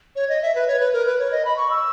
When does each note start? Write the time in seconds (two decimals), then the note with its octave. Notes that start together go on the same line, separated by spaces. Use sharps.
0.16 C#5
0.29 D#5
0.42 E5
0.55 B4
0.67 C#5
0.80 B4
0.93 A#4
1.06 B4
1.19 C#5
1.31 D#5
1.45 B5
1.57 C#6
1.70 E6